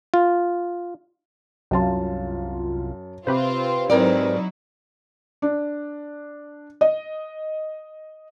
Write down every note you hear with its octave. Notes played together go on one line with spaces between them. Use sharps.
F4
C2 F#2 F4 A5
C3 C4 F4 G4 B4 C5
G#2 F#3 C4 D#4 E4 A#4 D5
D4
D#5